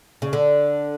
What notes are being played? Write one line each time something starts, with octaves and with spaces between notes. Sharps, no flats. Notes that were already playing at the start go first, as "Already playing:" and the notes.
C#3
D3